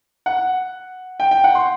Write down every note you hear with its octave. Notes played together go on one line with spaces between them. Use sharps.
F#5
G5
G5
F#5
C6